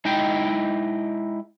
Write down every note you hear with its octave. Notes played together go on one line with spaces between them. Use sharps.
G#3 D#4 E4 D#5 G5